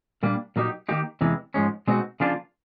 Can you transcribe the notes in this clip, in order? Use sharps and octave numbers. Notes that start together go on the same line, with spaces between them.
A#2 G3 A#3 D4
A#2 F#3 A#3 D#4 G4
D#3 F#3 A#3 D#4 G4
E2 C3 E3 G#3
G#2 F3 G#3 C#4
B2 G#3 C4 D#4 F#4
C#3 F3 A#3 D4 F4